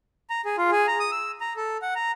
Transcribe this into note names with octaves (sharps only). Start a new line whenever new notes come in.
A#5
G#4
F4
G#4
A#5
D#6
E6
A#5
A4
F#5
A#5